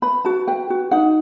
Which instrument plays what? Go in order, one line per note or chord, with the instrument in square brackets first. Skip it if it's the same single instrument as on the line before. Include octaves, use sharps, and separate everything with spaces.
[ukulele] B4 B5
F#4 A5
B4 G5
F#4
D#4 F#5